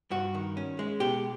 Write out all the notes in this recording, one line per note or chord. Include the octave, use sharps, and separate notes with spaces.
G2 F#4
D#3
C#4
G#3
B2 G4